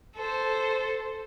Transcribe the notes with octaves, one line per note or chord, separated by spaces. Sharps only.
A4 C5